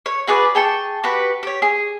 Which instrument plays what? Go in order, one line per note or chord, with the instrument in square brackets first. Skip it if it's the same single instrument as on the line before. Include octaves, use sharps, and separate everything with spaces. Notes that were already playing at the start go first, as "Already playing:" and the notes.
[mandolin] C#5
F#4 G#4 B4 D5
G#4 G5 A5 C#6
F#4 G4 B4
G4 C#5
G#4